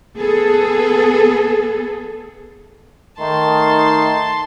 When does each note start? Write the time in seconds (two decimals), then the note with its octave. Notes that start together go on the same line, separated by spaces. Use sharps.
0.17 B3 G#4 A4
3.19 D#3 A3 D#4 A5 C6